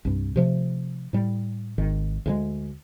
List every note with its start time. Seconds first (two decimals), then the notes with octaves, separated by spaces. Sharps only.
0.05 C2 G2
0.36 C3 F3 G#3 A3
1.13 A2 G3
1.78 G#1 D#3
2.26 D2 C#3 G#3